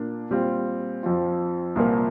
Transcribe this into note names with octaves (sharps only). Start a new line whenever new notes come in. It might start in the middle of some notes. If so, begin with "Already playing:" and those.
Already playing: A#2 A#3 D4
A#2 G3 C4 F4
F2 F3 C4 F4
C2 A#2 F3 A#3